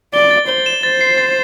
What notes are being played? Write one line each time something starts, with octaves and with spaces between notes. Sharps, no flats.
D5 G7
A6
C5 G7
E7
C5 A6
C7
A6